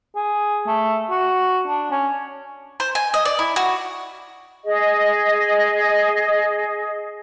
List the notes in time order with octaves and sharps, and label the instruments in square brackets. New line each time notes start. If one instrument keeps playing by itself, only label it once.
[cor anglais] G#4
A3
F#4
D4
C#4
[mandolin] C5
G#5
D#5
D5
E4
F#4
[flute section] G#4 D#5